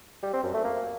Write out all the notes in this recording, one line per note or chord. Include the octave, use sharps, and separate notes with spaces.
G3
C4
F#2
A3
A#3